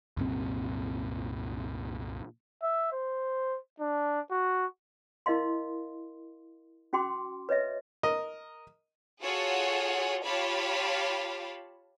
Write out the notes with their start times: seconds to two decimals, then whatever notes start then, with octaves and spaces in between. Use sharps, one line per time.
0.17 C2 F#2 A#2 C4
2.63 E5
2.92 C5
3.80 D4
4.31 F#4
5.26 E4 A#4 D#5 F5 C6
6.93 C#4 F#4 G5 C6 D6
7.49 B4 C#5 D#5 E5
8.03 A#4 D#5
9.22 F4 F#4 G#4 A4 C#5 F#5
10.24 F4 G4 C#5 F5 A5 B5